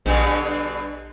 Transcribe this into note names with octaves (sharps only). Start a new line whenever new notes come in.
A#1 G2 B2 D3